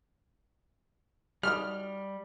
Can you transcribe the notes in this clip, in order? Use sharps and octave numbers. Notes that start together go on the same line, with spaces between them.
G3 D#4 F#4 D#5 F6